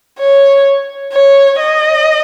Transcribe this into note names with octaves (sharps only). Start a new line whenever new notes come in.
C#5
C#5
D#5